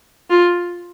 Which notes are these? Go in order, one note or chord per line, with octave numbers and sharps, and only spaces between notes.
F4